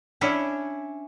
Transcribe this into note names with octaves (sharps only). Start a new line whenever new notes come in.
C#4 D4 E4